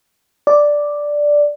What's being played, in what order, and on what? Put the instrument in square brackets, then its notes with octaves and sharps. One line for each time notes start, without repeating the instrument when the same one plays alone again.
[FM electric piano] D5